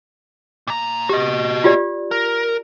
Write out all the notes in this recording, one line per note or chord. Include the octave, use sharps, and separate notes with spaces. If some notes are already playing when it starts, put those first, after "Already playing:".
A#2 A#5
F#4 G4 D#5
F4 G4 D5
A#4